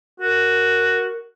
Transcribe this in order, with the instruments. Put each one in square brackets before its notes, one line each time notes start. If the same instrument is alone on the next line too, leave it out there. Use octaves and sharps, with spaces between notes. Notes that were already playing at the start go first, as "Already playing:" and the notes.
[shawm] F#4 [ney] A#4